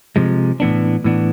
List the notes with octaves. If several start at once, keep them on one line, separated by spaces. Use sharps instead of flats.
C3 F3 G#3
A2 E3 B3 D4
A2 E3 B3 D4